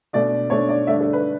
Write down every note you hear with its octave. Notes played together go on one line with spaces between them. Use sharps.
B2 A3 D4 D5
B2 A3 D4 C#5
D5
G2 D3 A3 D4 E5
A4
B4